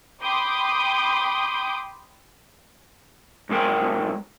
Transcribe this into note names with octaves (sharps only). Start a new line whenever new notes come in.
G5 B5 C6 D6 D#6 G6
B1 G#2 G#3 A#4 G5